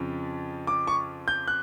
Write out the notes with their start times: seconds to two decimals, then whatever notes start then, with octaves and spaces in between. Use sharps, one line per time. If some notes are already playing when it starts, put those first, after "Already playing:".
Already playing: F2 C#3 F3
0.67 D6
0.87 C#6
1.28 G6
1.48 F#6